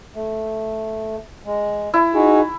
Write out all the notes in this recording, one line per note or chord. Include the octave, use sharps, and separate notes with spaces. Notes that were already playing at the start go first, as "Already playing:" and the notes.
A3
G#3
E4
D#4 F#4 G#4